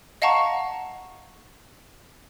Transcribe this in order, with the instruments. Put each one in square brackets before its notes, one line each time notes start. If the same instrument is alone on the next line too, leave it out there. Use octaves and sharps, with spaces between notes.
[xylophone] D#5 F5 F#5 A5 A#5 C#6